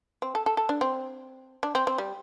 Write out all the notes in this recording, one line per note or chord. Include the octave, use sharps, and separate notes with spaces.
C4
A4
A4
A4
D4
C4
D4
C4
C4
G3